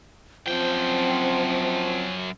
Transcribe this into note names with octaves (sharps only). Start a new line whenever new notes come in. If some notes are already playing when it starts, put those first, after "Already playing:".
F#2 F3 C4 G5